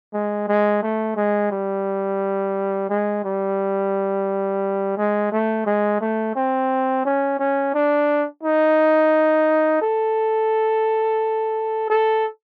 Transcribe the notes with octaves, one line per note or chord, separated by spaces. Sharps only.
G#3
G#3
A3
G#3
G3
G#3
G3
G#3
A3
G#3
A3
C4
C#4
C#4
D4
D#4
A4
A4